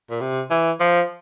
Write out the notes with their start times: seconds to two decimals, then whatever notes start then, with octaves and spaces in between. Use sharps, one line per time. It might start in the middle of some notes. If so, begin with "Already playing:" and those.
0.10 A#2
0.21 C3
0.50 E3
0.80 F3